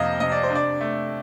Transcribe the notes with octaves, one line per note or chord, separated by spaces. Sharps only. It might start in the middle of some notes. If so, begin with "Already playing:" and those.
Already playing: F2 C3 A#3 D#5 F5
C3 D#5
D5
C5
D4
D5
A3